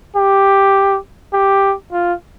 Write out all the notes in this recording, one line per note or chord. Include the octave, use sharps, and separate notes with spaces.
G4
G4
F4